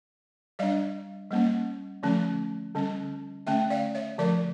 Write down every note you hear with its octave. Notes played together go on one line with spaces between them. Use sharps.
G3 D4 D5 F5
G3 A#3 C#4
D3 F3 A3 C#4
D3 G3 C#4
D3 A3 C#4 E5 G5
D5 F5
C#5 E5
D3 F3 A3 A#4 D5